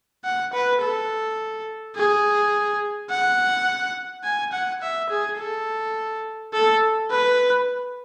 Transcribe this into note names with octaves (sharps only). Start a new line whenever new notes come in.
F#5
B4
A4
G#4
F#5
G#5
F#5
E5
G#4
A4
A4
B4